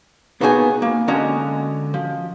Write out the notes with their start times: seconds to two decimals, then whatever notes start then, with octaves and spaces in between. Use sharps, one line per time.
0.41 A#3 B3 D#4 F#4 G#4 G#5
0.82 A#3
1.08 D3 G#3 C#4 F#4 D#5 A#5
1.94 F3